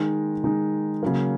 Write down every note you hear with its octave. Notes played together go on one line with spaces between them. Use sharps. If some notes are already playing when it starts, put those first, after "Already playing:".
Already playing: D#3 G#3 D#4
D#3 G#3 D#4
C#3 F#3 A#3